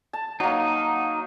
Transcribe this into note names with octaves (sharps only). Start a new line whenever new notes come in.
A5
F#3 A#3 D#4